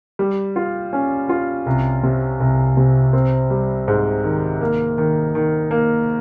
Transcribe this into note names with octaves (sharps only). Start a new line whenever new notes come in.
G3
F4
C#4
F4
C2
C3
C2
C3
C4
G3
G#2
D#3
A#3
D#3
D#3
A#3